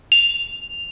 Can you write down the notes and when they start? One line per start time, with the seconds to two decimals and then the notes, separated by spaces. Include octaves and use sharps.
0.12 F7